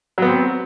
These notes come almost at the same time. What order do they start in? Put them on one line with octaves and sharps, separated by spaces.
F#3 B3 C4